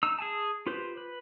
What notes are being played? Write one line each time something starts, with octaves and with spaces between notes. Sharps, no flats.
D#4 E6
G#4 G#5 A5
F4 G4 B4 C5
B4